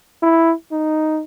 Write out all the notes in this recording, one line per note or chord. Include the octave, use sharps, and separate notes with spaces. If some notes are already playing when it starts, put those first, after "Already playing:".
E4
D#4